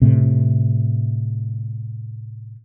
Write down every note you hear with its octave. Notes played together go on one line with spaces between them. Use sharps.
A2 C3